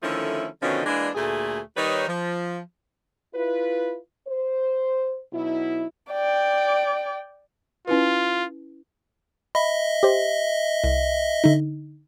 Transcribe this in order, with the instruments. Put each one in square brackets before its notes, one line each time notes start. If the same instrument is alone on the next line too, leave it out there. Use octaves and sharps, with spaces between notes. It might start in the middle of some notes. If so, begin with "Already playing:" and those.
[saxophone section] D3 D#3 F3 A3 C#4 E4
B2 D3 D#3 F3 C#4 D#4
E3 G#3 A#3 D4
D2 A#2 A3 G#4
D#3 G3 D#4 B4 C#5
F3
[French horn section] E4 F4 B4
C5
B2 F#3 D#4 E4
[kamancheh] D5 G5
[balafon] C#4 E4 B4 [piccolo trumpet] F4
[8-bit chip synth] D#5 E5 [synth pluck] B5
[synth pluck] G4 C5
C2
D3 D#4